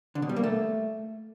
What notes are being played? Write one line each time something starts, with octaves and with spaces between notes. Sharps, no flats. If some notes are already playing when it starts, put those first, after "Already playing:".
D3
B2
G3
A#3
A3